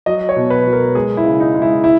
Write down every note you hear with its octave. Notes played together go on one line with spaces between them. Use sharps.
F#3 D#5
C#5
B2
B4
F#3
A#4
G#3 G#4
E4
C#3
D#4
G#3
E4
E4